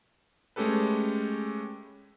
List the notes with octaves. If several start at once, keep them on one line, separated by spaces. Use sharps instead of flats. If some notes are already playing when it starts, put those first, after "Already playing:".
G#3 A3 C#4 G4 A4 B4